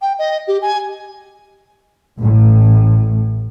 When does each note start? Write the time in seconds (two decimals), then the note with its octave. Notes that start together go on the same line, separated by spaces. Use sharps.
0.02 G5
0.19 D#5
0.47 G4
0.62 G#5
2.19 A1 A2